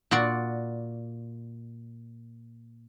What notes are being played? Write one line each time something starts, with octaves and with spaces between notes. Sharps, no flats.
A#2 F#4 D5